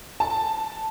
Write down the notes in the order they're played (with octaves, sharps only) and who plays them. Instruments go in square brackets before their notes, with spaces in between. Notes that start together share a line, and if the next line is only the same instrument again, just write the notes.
[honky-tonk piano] A5